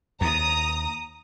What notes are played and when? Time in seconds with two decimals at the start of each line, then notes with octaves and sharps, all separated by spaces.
0.21 D#2 A#5 D#6